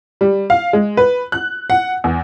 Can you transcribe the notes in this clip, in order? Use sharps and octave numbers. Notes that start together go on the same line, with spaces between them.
G3
F5
G#3
B4
F#6
F#5
E2